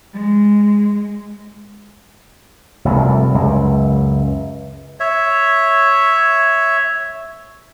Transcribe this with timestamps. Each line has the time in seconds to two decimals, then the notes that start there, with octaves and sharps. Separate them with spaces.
0.13 G#3
2.85 F1 C2 F2
3.33 C#2 F#2
5.00 C#5 E5